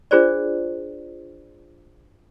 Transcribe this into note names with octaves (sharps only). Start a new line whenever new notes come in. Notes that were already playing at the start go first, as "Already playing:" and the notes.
D4 F4 G#4 C5 D5